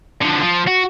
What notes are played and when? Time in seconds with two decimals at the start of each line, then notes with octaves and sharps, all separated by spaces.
0.21 D3 F3
0.42 F3
0.67 F#4